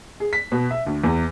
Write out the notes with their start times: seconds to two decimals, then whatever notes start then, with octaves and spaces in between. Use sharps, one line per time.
0.20 G#4
0.33 B6
0.52 B2
0.71 E5
0.86 D2
1.04 E2